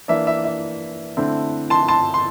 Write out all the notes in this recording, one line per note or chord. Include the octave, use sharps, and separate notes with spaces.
E3 A#3 D4 E5
E5
E5
D3 A3 C4 E4
A5 C6
A5 C6
C6